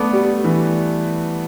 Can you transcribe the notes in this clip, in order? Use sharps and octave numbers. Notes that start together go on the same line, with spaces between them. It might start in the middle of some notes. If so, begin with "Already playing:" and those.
Already playing: A3 B3 D5
G3
E3